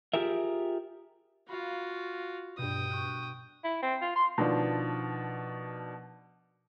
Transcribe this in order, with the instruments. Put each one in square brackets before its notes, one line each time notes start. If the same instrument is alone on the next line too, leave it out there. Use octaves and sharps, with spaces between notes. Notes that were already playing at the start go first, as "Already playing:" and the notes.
[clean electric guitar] F4 G4 G#4 A#4 E5
[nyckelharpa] F4 F#4 [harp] F5 B5
[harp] G2 B2 [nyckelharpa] G5 D#6
[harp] C#6 F#6
[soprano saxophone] E4
C4
F4
C6
[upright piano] B2 D#3 F3 D4